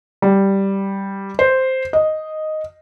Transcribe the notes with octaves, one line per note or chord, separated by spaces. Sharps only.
G3
C5
D#5